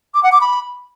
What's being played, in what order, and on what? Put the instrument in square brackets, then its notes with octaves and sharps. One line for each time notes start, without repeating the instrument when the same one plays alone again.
[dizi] D6
F#5
D6
B5